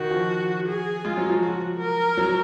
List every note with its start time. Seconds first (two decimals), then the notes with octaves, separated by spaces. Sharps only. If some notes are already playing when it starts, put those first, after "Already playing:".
Already playing: D#3 F#4
0.11 F3
0.68 G#4
1.05 G#3 F4
1.18 F#3
1.30 F3
1.42 F#4
1.80 A#4
2.17 F#3